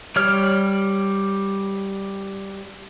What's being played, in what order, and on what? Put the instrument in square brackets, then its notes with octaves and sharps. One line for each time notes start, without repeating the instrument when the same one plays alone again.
[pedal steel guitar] G3 C#5 F6